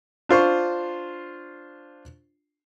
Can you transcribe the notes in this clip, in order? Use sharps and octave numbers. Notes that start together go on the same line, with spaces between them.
D4 F4 C5 C#6